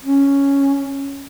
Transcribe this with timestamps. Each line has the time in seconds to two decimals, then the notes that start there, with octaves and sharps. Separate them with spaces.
0.05 C#4